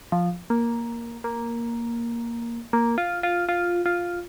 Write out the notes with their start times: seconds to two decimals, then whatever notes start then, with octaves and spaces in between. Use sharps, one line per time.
0.12 F3
0.50 A#3
1.24 A#3
2.73 A#3
2.98 F4
3.23 F4
3.49 F4
3.86 F4